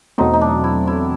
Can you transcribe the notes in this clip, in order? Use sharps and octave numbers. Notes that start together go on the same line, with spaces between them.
E2 B2 F#3 A3 C4 D#4
D#4
D4
E4
E4